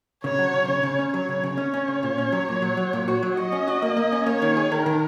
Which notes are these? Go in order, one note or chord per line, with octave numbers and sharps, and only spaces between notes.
C#3 C#5
F#3
C#3
C#3 C#5
C#3
C#4
F#3 C#5
C#3
C#3
C#4 C#5
C#4
C#3
A#2
C#4
F#3
A#2
F#3
F#3
A#2
F#4
F#3
F#4 D#5
C#4
F#4
A#3
A#3
C#4
A#3 C#5
D#3
G#4
D#3 A#4
D#3